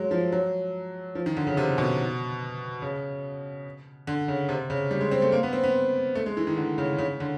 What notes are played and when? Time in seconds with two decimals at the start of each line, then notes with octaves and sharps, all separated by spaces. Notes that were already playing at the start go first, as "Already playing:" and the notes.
Already playing: F#3 G#3
0.11 F3
0.32 F#3
1.15 F3
1.26 D#3
1.37 D3
1.47 C#3
1.57 C3
1.78 B2
2.82 C#3
4.07 D3
4.28 C#3
4.49 C3
4.70 C#3
4.91 G3
5.01 G#3
5.11 C4
5.22 A3
5.32 A#3
5.43 B3
5.53 C4
5.64 B3
6.15 A3
6.26 G#3
6.37 E3
6.47 D#3
6.57 D3
6.78 C#3
6.98 C#3
7.20 D3